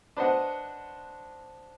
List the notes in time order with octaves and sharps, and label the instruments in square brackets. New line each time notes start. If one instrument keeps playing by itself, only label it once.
[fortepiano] D4 B4 C5 D#5 F#5